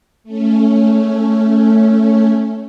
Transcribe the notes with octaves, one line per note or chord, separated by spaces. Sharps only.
A3 C#4